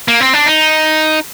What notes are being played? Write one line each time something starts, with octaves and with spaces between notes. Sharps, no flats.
A#3
C4
D4
D#4